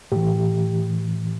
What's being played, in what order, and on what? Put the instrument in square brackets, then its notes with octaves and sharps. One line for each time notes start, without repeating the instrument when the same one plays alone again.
[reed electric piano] A2 E3 G4